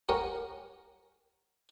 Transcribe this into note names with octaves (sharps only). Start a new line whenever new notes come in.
G4 A#4 C#5 F#5 G#5